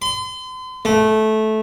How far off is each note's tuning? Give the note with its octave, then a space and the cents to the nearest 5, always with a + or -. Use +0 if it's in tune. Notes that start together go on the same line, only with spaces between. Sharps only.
C6 -40
A3 -15